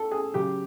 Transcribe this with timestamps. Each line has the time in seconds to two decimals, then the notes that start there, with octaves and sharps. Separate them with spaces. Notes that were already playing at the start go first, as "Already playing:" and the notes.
Already playing: A2 A4
0.12 G#4
0.34 C#3 F#3 G4